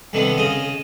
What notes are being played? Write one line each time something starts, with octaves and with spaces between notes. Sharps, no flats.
C2 D3 D#3 B3
C#3 D#5